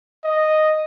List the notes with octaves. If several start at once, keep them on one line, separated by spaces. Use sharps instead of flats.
D#5